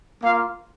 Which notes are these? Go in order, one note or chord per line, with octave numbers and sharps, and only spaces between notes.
A#3 F4 F5